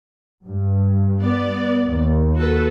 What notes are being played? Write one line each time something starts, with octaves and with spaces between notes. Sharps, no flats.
G2
B3 D5
D#2
F#4 A4 B4